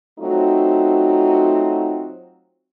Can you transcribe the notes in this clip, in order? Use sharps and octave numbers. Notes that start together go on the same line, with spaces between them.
F#3 A3 C4 D#4 F4 F#4